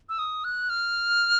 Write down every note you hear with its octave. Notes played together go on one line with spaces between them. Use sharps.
E6
D#6
F#6
F6